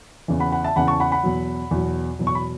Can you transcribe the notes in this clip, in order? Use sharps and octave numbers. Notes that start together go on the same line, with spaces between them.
E2 C#3 E3
F#5 B5
F#5 B5
E5 A5
E2 C#3 E3 F#5 B5
A5 C#6
F#5 B5
F#5 B5
E2 B2 F#3
E2 B2 F#3
E2 B2 F#3
C#6
B5